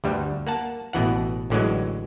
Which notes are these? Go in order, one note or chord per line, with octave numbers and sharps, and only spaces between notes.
D2 G2 G3
A#3 F#5 A5
A1 B2 E3 F#5
A1 D3 E3 F#3 G#3